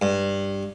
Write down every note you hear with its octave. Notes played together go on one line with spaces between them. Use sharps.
G2